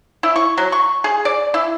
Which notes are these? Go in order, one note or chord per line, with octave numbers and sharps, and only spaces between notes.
E4
C#6
F#3
C#6
G#4
D5
E4